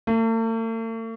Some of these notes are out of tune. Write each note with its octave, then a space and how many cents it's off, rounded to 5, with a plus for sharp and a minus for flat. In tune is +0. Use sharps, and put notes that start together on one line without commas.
A3 +45